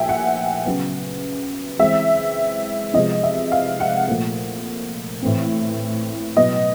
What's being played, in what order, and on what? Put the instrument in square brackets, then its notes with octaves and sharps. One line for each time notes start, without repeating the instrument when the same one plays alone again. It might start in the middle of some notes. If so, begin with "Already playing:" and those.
Already playing: [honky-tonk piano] A#2 F3 A3 E5 G5 G#5
F#5
C#3 F#3 B3
E3 G#3 C4 E5
C3 F3 G#3 B3 D#5
E5
F5
F#5
A#2 F3 A3
A2 E3 A3 C4
B2 F#3 B3 D#5